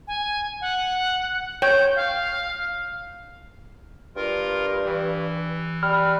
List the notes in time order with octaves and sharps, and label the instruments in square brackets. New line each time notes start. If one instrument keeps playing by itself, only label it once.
[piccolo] G#5
F#5
[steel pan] C#5 G5 [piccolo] G6
[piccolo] F5
[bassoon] G2 [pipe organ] F4 A#4
[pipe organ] E3
[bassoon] G3 [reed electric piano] B5 F6